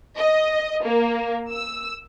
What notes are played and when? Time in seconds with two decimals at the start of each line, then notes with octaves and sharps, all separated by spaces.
0.18 D#5
0.84 A#3
1.50 E6